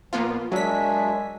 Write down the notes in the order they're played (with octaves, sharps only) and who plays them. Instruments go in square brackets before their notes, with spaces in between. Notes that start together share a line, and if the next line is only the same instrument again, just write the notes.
[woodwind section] A#2 F3 [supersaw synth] A#3 B3 F4
[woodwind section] A#2 F#4 G#5 [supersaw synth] F#3 B6 [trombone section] G#3 [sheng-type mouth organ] D4 E5